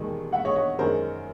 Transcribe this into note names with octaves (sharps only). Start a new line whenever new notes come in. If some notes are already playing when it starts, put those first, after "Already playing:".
Already playing: E1 D#2 D#3 G#3
E5 F#5
C#5 D#5
C#5 D#5
F#2 D#3 G#3 A#4 C5